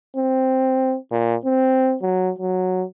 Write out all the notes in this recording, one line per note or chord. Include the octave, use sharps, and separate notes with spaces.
C4
A#2
C4
F#3
F#3